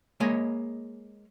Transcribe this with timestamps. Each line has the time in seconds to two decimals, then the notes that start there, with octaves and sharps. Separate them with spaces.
0.20 G#3 A#3 C#5 D#5